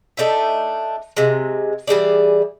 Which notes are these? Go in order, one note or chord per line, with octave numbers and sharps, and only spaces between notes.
A3 D4 D#4 E5
C3 G#3
E3 G3 G#4 D5